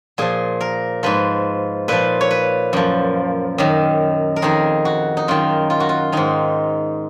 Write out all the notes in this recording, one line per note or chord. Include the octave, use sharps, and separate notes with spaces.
A#2 F3 G#4
A#4
G#2 F3 B4
A#2 F3 B4
C#5
B4
F#2 F3
F#2 D#3
A#4
F2 D#3 G#4
F#4
D#4
F#2 D#3 F4
F4
F#4
F4
G#2 D#3 D#4